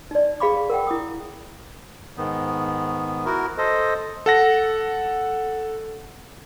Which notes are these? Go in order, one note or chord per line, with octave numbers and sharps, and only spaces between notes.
D#4 D5
G#4 F5 B5 D6
A#4 F#5 G5
E4 D6 D#6
G#2 D#3 B3
E4 F#4 A#4
A4 C5 D#5
A4 F#5 A#6